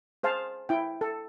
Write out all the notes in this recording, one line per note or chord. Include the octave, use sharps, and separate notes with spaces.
G#4 C5 F5 A5
E4 G5
A4